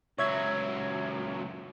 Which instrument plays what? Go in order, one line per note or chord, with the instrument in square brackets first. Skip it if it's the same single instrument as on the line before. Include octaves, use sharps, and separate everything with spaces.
[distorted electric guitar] C#2 F#3 [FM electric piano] C#5 E5 G#6